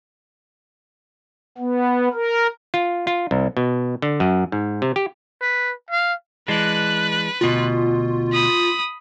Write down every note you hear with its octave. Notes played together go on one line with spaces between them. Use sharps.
B3
A#4
F4
F4
C2
B2
D3
F#2
G#2
C3
G4
B4
F5
E3 G#3 D4 B4 F#6
D2 B2 F4
B5 D#6